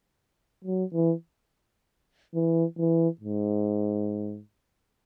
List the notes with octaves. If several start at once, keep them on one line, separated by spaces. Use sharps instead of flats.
F#3
E3
E3
E3
G#2